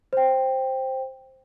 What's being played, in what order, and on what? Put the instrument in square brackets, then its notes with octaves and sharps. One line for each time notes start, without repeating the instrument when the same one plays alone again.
[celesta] C5 G5